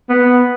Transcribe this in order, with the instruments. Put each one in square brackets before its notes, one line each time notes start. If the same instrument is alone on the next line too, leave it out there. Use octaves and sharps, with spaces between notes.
[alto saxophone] B3